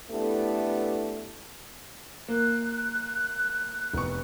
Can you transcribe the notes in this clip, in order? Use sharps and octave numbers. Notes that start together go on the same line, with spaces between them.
A3 B3 D4 E4 G4 A4
A#3 F#6
F1 B3 C#6